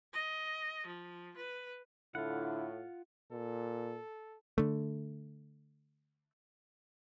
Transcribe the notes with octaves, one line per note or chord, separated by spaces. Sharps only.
D#5
F3
B4
A2 D3 E4 F4 F#5
A#2 A4
D3 A3